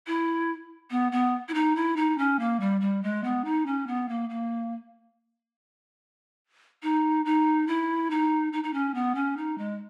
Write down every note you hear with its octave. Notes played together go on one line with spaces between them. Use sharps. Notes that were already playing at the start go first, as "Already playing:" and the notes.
E4
B3
B3
E4
D#4
E4
D#4
C#4
A#3
G3
G3
G#3
B3
D#4
C#4
B3
A#3
A#3
D#4
D#4
E4
D#4
D#4
D#4
C#4
B3
C#4
D#4
G#3